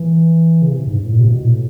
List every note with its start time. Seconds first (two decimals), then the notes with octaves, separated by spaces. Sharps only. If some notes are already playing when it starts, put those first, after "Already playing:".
Already playing: E3
0.62 C#3
0.71 C3
0.87 G#2
0.95 G2
1.04 A2
1.12 A#2
1.20 C3
1.28 B2
1.45 A2